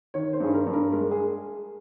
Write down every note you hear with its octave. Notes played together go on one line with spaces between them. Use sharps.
D#3 C#5
C5
G2 G#4
A#4
G2
A#4
G#3 A#4
G#4